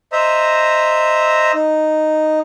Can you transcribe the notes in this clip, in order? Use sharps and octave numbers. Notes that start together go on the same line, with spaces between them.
C5 D#5 E5 A#5
D#4